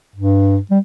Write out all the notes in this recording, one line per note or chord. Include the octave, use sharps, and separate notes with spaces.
G2
G3